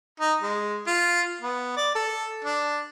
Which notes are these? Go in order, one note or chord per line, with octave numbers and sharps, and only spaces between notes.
D#4
G#3
F4
B3
D5
A4
D4